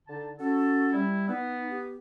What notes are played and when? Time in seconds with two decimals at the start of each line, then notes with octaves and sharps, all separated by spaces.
0.07 D3 D#4 A5
0.40 C#4 F#4 A4
0.93 G3 E4
1.28 B3 D#4
1.70 G4